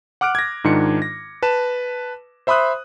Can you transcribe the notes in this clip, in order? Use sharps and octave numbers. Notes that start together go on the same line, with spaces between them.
F#5 D6 F6 F#6 D7
G#6 A#6
G#2 D#3 D4 F4 C#7
A#6
B4 A5 E7
C5 E5 B5 C6 D#6 F#6